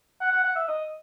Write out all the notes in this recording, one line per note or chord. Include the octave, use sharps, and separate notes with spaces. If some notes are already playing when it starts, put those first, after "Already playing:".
F#5
F#5
F#5
E5
D#5